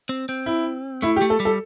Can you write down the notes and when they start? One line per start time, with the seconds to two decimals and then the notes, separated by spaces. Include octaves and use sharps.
0.09 C4
0.29 C4
0.46 E4
1.02 A3 E4
1.16 G4
1.22 A3
1.30 A4
1.40 G3
1.45 A4